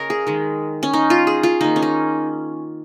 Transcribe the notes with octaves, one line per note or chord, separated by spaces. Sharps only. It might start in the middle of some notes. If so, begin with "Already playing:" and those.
Already playing: C#3 A#4 C#5 D#5
G#4
D#3 G#3
C#4
D#4
F4
G#4
F4
D#3 A#3 D#4
C#4
D#4